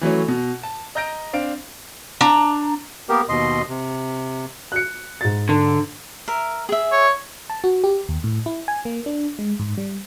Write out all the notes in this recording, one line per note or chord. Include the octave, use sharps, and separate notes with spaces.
E3 F#3 A3 C#4
B2
A5
D#5 A#5 G6 A#6 D7
C4 D4 F5 D7
D4 A#5
A#3 B3 G4 A#4
D#2 B2 D#5 C6
C3
F#6 C#7
G#2 A6
D3
A#4 E5
G#4 E5
C#5
A5
F#4
G4
D#2
A2
E4
G#5
A#3
D4
G#3
G#2
G3